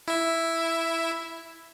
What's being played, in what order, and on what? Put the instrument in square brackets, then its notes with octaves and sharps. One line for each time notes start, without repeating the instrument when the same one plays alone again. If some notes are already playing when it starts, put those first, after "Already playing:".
[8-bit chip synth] E4 E5